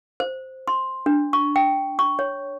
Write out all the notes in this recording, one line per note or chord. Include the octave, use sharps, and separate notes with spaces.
C5
C6
D4
C#6
G5
C#6
C#5